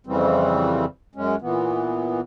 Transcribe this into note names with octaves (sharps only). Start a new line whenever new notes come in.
F2 C#3 E3 G3 C4
F#2 G#3 C#4
A#2 E3 B3